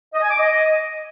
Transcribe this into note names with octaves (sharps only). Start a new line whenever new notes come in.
D#5
G#5
D6
D#5